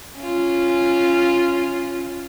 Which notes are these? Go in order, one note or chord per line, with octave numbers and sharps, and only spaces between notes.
C#4 F4